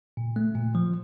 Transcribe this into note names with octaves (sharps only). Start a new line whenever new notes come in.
A#2
A3
A#2
F3